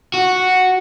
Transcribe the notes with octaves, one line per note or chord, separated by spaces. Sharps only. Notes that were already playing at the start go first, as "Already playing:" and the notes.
F#4